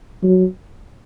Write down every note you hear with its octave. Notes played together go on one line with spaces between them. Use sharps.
F#3